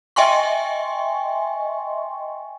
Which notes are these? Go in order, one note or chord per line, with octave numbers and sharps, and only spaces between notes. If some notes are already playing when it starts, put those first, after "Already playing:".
D#5 E5 G5 G#5 C6 C#6